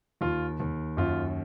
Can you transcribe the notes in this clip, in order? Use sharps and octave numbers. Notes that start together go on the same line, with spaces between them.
D#2 F4
D#2
F#2 F4